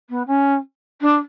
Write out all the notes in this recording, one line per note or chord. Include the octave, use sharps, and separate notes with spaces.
B3
C#4
D4